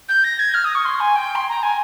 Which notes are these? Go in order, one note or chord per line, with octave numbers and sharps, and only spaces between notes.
G6
A#6
G#6
F6
D#6
C#6
C6
G#5
G5
C6
A#5
G#5